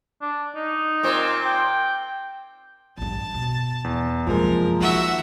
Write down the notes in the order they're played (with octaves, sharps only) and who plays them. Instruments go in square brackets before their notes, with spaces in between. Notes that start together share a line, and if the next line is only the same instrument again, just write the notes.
[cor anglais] D4
D#4
[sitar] A#2 C4
[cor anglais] G5
[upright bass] A1 G2 [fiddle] A5
[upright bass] B2
[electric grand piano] E2
[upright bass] F#2 C3 [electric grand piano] F3 G#3 A#3 [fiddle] A#4
[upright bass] D#3 [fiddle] F#4 E5